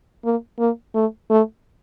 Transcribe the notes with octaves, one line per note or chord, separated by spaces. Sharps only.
A#3
A#3
A3
A3